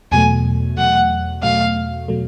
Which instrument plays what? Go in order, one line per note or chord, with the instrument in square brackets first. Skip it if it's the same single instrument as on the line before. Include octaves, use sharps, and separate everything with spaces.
[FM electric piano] E2 B2 F#3 A3 [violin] G#5
[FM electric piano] E2 B2 F#3 A3 [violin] F#5
[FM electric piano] E2 B2 F#3 A3 [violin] F5
[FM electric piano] B2 F#3 A3